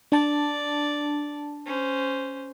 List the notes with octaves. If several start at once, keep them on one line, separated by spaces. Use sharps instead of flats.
D4 D5 A5
C#4 C5